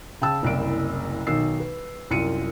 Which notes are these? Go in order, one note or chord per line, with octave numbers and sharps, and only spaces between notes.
C#3 G5 A5 E6
F#1 C2 E4 D7
B1 D#3 E6 C7
B4
C2 F#2 F4 C#7 D#7